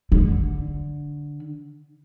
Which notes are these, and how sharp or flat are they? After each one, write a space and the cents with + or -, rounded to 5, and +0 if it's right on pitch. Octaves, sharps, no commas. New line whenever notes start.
D3 -5